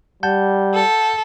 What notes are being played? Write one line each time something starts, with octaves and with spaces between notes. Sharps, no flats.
G3 F#5 A5 G6
A4